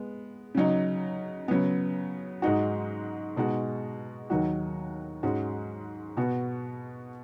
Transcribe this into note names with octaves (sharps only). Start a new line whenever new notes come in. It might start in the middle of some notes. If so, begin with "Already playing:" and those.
Already playing: G#3 B3
C#3 F#3 D#4
C#3 F#3 B3
G#2 G#3 D#4 F#4
B2 G#3 D#4 F#4
D#2 D#3 F#3 D#4 F#4
G#2 G#3 C#4 F#4
B2 B3 F#4